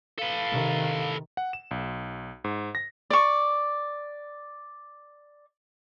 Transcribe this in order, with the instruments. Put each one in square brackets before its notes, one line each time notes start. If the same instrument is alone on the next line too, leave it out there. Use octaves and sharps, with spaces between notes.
[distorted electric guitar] A4 B4 [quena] F5
[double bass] C3 D#3
[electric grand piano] F#5
E7
B1
G#2
A#6
[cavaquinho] D5 C#6